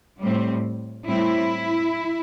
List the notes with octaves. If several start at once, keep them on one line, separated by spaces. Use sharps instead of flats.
A2 G3 C4
A2 G3 C4 E4